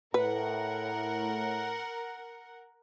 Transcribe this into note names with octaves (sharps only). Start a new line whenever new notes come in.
A2 A#4 B4 F#5